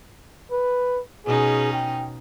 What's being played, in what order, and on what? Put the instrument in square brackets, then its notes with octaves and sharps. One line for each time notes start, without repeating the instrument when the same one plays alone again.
[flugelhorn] B4
[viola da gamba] B2 C#4 D#4 [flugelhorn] G#4
[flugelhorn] G5